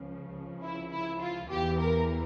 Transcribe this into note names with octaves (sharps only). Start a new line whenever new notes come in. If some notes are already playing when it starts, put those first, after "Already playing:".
Already playing: C#2 C#3 F3
E4
E4
F4
E2 E3 G4
A#4